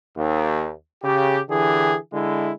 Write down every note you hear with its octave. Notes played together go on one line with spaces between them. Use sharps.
D#2
C#3 G4
D3 E3 G4 G#4
D3 G#3 E4